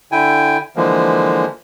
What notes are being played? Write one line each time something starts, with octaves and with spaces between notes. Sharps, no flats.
D3 E4 G5 G#5
D3 E3 F3 G#3 A#3